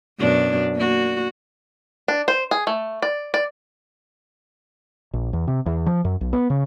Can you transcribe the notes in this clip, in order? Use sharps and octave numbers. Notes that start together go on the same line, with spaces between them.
F#2 B2 D4
A#3 F#4
D4
C5
G#4
A3
D5
D5
A#1
E2
C3
E2
F3
F#2
B1
B3
C#3